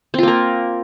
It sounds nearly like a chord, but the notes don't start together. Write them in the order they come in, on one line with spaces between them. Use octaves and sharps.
C4 F4 A#3 A#4